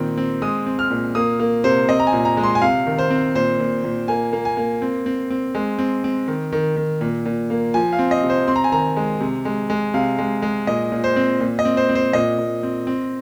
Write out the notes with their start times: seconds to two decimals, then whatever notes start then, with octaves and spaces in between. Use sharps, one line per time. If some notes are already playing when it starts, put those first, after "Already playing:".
Already playing: A#2 D#3 C4
0.17 C4
0.42 G#3 D#6
0.66 C4
0.79 F6
0.91 A#2
1.15 A#3 D#6
1.40 A#3
1.64 C3 C5
1.88 C4 D#5
2.00 A#5
2.07 G#5
2.13 A#2
2.25 A#5
2.37 G#3
2.43 C6
2.55 G#5
2.62 C3 F5
2.87 D#3
2.98 C5
3.10 C4
3.35 A#2 C5
3.60 A#2
3.84 A#2
4.08 A#3 G#5
4.33 A#3
4.45 G#5
4.57 A#3
4.82 C4
5.06 C4
5.30 C4
5.55 G#3
5.79 C4
6.04 C4
6.28 D#3
6.52 D#3
6.76 D#3
7.01 A#2
7.26 A#2
7.50 A#3
7.74 F3 G#5
7.93 F5
7.99 C4
8.11 D#5
8.23 C3
8.30 C5
8.48 C4 C6
8.56 A#5
8.64 G#5
8.72 D#3 A#5
8.97 G#3
9.21 C3
9.45 G#3
9.70 G#3
9.94 C3 F5
10.18 G#3
10.42 G#3
10.67 A#2 D#5
10.92 A#2
11.04 C5
11.16 C4
11.40 A#2
11.59 D#5
11.65 C4
11.77 C5
11.89 C4
11.95 C5
12.13 A#2 D#5
12.38 A#2
12.63 C4
12.87 C4